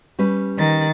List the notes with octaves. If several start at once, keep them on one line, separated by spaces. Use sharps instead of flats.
G3 C#4 B4
D#3 A6